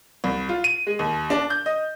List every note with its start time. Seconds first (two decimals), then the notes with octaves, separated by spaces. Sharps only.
0.24 C2
0.49 F4
0.64 D#7
0.87 G#3
0.99 D#2
1.30 D4
1.50 G6
1.66 D#5